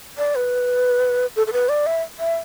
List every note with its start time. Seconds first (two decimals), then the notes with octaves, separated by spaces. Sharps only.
0.18 D5
0.35 B4
1.36 A4
1.47 A4
1.53 B4
1.69 D5
1.86 E5
2.19 E5